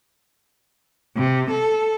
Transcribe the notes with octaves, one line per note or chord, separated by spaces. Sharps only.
C3
A4